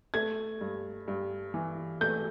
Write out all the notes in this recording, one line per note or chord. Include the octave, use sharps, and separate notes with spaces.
A3 G#6
G2
G2
E3
A3 G6